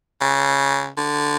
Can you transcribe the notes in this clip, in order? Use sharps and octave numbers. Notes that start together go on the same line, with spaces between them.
C#3
D3